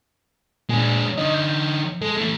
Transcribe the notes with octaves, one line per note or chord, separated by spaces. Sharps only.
A#2 G#3 D4 G#5
D3 D#4 D#5
G6
G#3 A4
E3 A3